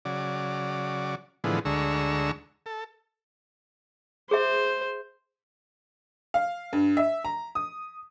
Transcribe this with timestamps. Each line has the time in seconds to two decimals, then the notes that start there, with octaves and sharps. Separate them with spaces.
0.05 C#3 F#3 D5
1.44 A2 D3 E3 F3 G#3 B3
1.65 D2 D3 G#3 A#5 C#6 E6
2.66 A4
4.31 G#4 C5 E5
6.34 F5
6.73 G2
6.97 E5
7.24 A#5
7.55 D#6